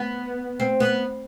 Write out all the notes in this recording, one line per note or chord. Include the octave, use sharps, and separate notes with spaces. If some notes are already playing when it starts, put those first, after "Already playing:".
Already playing: B3
C4
B3